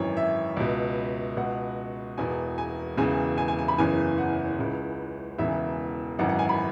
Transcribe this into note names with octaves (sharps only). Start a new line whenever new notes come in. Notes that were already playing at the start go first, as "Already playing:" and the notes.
Already playing: G#1 F#2 E3 C#5
E5
C#2 B2
C#2 B2 F#5
E1 E2 B2 G#5
G#5
E1 E2 C#3 E3 G#5
G#5
G#5
G#5
B5
F#1 E2 C#3 E3 G#5
F#5
C#2 C#3 E3
E1 E2 C#3 E3 E5
G#1 F#2 E3 F#5
F#5
G#5
B5